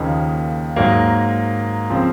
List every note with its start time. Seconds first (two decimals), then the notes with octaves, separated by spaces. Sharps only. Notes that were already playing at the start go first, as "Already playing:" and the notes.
Already playing: D#2 C#3 F3 A#3 D#4
0.76 G#2 F#3 A#3
1.90 C#3 F3 C4